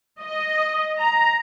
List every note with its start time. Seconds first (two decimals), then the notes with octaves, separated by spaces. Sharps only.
0.21 D#5
0.99 A#5